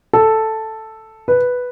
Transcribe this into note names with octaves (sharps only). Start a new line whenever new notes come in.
A4
B4